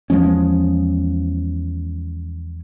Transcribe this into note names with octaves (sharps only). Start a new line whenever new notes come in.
E2 F3 G#3 C#4